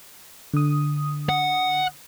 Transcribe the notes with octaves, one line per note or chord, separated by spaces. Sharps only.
D3 D#6
F#5